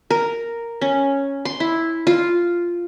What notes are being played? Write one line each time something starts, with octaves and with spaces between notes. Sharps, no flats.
A#4
C#4
C6
E4
F4